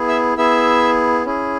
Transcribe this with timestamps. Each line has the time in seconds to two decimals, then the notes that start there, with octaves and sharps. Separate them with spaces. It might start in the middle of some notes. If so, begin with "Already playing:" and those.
Already playing: B3 E4 G#4
0.08 E5 E6
0.37 B3 E4 G#4 E5 E6
1.25 C#4 E4 G#4